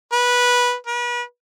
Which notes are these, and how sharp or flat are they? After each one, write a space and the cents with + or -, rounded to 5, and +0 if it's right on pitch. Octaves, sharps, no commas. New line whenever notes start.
B4 -15
B4 -35